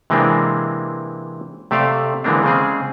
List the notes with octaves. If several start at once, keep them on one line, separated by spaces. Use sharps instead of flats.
C3 E3 G#3 A#3 C4 D4
C3 A3 G4 C5 D5 F5
D3 E3 G#3 A#3 C4 D4
C#3 G#3 C4 G#4